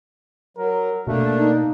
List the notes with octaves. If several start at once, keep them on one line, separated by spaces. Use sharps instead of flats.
F#3 A#4
B2 A3 A#3 D4
D#4